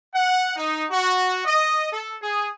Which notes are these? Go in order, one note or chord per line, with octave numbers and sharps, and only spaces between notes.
F#5
D#4
F#4
D#5
A4
G#4